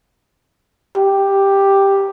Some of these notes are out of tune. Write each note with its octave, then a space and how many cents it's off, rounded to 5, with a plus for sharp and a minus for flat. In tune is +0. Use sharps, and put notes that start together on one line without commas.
G4 +5